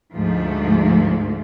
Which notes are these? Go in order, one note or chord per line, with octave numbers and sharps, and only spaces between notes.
D2 G#2 F3 A3